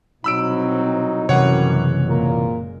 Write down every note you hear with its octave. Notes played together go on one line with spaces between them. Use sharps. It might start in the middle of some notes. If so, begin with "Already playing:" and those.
C2 B2 F#3 C4 D#4 B5 E6 D7
F#1 F#2 C3 E3 G3 G#3 C#5 F#5
A#2 A#4